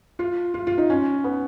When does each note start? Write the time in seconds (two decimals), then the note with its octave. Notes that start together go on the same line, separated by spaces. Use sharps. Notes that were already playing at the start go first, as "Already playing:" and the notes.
0.19 F4
0.54 F4
0.67 F4
0.78 D#4
0.90 C#4
1.24 B3